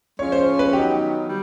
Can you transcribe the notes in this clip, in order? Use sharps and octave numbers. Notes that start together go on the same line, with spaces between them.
F3 G#3 C#4 F4 C#5
C5
B4
D#3 F#3 B3 D#4 G4
G3